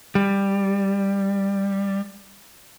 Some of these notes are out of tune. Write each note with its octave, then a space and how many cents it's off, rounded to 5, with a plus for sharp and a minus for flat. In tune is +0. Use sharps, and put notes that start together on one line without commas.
G3 +10